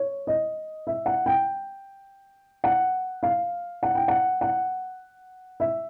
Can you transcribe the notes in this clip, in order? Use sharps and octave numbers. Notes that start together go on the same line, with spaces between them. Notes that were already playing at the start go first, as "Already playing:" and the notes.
Already playing: C#5
D#5
E5
F#5
G5
F#5
F5
F#5
G5
F#5
F#5
E5